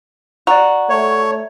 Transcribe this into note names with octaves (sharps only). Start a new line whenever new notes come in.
F#4 D5 A#5
A3 C#5